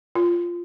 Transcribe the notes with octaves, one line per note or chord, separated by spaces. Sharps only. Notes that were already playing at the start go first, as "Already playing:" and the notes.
F4